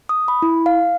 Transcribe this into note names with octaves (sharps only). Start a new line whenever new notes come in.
D#6
B5
E4
F5